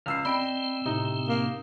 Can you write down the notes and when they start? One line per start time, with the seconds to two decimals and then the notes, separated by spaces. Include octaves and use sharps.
0.06 C#2 E6 F6 C7
0.25 C4 D5 D#5 G5 B5 D7
0.86 A2 C3 D#4
1.28 A#3